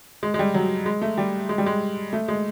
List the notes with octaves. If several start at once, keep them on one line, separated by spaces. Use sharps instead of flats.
G#3
G#3
G3
F#3
G#3
A3
G3
G#3
G3
G#3
A3
G#3